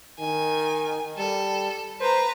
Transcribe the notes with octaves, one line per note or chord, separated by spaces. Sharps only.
D#3 G#5
G3 A4
B4 C5 A#5